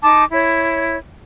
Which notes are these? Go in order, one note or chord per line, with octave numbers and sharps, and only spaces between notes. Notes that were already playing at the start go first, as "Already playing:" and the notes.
D#4 A5 D6
E4 C#5